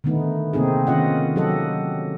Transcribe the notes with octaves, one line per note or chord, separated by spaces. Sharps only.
D3 D#3 A3 B3 D#4
C3 A#3 C4 D#4 G#4
D#3 C#4 F4 D#5 F#5
F#3 G4 A4 D#5 F#5